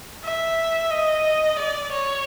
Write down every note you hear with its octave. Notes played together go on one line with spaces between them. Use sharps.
E5
D#5
D5
C#5